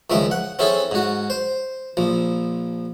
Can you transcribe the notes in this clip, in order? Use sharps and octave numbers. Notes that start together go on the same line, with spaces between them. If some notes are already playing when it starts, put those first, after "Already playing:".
C#2 D#3 F3 G#3 E5
F#5
C4 C#4 E4 G#4 A4
G#2 F#4
C5
A#1 F3